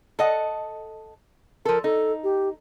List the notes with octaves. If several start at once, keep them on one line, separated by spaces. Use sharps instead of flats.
A4 D#5 F#5
F3 A4 A#4
D#4 A4
G4